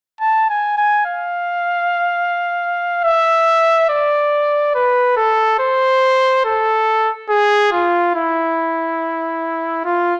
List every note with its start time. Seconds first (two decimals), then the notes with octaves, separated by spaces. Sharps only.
0.21 A5
0.50 G#5
0.78 G#5
1.06 F5
3.04 E5
3.89 D5
4.75 B4
5.17 A4
5.59 C5
6.45 A4
7.29 G#4
7.72 F4
8.15 E4
9.84 F4